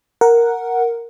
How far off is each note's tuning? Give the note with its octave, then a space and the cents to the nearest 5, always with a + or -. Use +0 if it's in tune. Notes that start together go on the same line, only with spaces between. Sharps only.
A#4 +0 F#5 +0